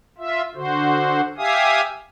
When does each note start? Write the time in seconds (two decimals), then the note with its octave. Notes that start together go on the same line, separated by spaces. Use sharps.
0.18 F4 E5
0.55 D3 F#4 C5
1.38 G4 E5 F5 G#5 D#6